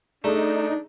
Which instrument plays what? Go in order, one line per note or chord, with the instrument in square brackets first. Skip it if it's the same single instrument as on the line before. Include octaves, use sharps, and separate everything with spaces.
[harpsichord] A3 [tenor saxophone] D4 [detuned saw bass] D#4 [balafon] G#4 D5